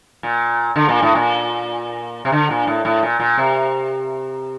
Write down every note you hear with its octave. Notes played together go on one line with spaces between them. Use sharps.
A#2
D3
A#2
A2
A#2
C3
D3
A#2
A2
A2
A#2
A#2
C3